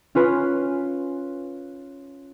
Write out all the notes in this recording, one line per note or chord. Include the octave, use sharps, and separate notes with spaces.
C#4 F4 B4